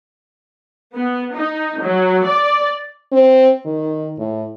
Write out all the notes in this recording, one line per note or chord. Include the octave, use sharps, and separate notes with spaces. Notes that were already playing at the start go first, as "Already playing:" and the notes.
B3
D#4
F#3
D5
C4
D#3
A2